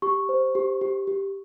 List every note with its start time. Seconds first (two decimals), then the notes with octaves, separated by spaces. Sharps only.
0.02 G4 C#6
0.29 C5
0.55 G4
0.81 G4
1.07 G4